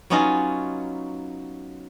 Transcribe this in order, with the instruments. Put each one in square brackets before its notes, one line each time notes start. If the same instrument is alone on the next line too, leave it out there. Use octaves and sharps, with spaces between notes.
[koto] F#3 B3 C#4 D#4 F4